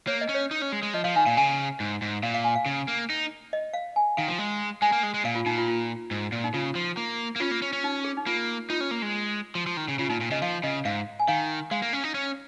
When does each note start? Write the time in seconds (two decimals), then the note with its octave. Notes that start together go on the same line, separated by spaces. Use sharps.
0.07 A#3 C#5
0.21 D#5
0.29 C#4
0.35 C#5
0.51 D#4
0.62 C#4
0.72 G#3
0.83 G#3
0.94 F3 D#5
1.04 F3 F5
1.15 D#3 G#5
1.26 A#2 F5
1.37 C#3 G#5
1.80 G#2
2.02 G#2
2.23 A#2 F5
2.34 F5
2.44 G#5
2.56 F5
2.66 C#3
2.88 A#3
3.10 D#4
3.53 D#5
3.73 F5
3.96 G#5
4.17 D#3 F5
4.28 F3
4.39 G#3
4.82 G#3 G#5
4.92 A#3
5.03 G#3
5.14 G#3
5.24 A#2 F5
5.35 F4
5.46 A#2 D#4
5.58 F4
5.68 F4
6.11 G#2
6.32 A#2
6.44 D#4
6.54 C#3 F4
6.75 F3
6.97 A#3
7.36 A#3
7.40 C#4 F4
7.51 A#3
7.62 C#4
7.73 C#4
7.84 D#4
8.04 G#4
8.17 D#4
8.26 A#3 F4
8.70 D#4 F4
8.80 C#4
8.91 A#3
9.02 G#3
9.55 F3
9.66 F3
9.77 D#3
9.88 C#3
9.99 C#3 F4
10.09 A#2 D#4
10.21 A#2
10.31 C#3 D#5
10.42 F3 F5
10.63 C#3 D#5
10.85 G#2 F5
11.19 G#5
11.28 D#3 F5
11.71 G#3 F5
11.82 A#3
11.93 C#4
12.04 D#4
12.14 C#4